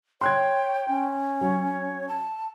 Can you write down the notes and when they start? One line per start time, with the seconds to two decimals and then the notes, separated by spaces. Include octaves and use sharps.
0.21 C#5 G5 C6 F#6 G#6
0.88 C#4
1.41 F#3 C#5
2.09 A5